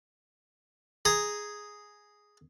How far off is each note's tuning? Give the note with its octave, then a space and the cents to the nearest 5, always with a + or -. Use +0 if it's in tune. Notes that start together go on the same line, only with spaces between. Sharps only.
G#4 +0 A#5 +0